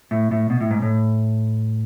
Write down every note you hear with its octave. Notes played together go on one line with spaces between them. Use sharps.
A2
A2
B2
A2
G#2
A2